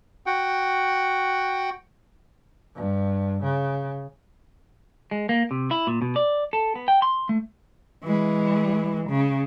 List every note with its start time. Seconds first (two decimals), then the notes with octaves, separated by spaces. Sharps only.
0.26 F#4 F#5 G5
2.75 G2
3.43 C#3
5.11 G#3
5.29 A#3
5.51 C3
5.71 E4
5.87 A#2
6.02 B2
6.16 D5
6.53 A4
6.76 B3
6.88 G5
7.02 C6
7.29 A3
8.04 E3 G#3
9.10 C#3